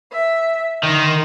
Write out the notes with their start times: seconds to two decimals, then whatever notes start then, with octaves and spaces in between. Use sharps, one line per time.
0.11 E5
0.83 D3 D#3 D#4 C6